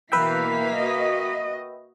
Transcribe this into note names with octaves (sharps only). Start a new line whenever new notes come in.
B2 E3 A#3 B4 E5 F5 G5 B6
F#4 D#5